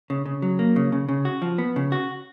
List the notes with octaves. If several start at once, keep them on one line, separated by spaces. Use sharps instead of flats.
C#3
C#3
F#3
A#3
C#3
C#3
C#3
F#4
F3
B3
C#3
F#4